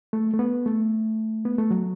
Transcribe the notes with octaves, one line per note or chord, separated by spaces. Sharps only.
A3
A3
B3
A3
B3
A3
F#3